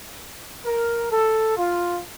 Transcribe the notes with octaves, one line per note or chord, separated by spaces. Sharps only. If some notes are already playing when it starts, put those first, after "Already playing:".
A#4
A4
F4